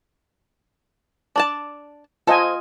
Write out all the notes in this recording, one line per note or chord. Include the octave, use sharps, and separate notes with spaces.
D4 D5 A5
F4 A4 C5 D#5 G#5